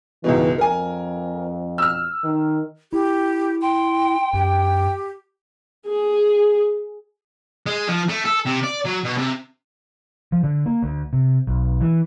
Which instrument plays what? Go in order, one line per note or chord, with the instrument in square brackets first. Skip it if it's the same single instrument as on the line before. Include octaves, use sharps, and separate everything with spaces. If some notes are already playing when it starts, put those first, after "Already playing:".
[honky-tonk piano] C#2 G#2 B2 [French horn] E3
[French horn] F2 [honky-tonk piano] A#4 G#5
[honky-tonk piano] E6 F6
[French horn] D#3
[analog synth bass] E4 [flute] G4
[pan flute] G5 [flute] C6
[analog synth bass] F#2 [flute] G4
[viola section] G#4
[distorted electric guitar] G#3
F3
A3
A4
C3
D5
F#3
B2
C3
[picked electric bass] F3
D3
A#3
D2
C3
B1
E3